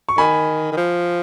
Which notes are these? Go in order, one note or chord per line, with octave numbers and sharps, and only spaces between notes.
C#6
D#3 G#5 B5
D#3
F3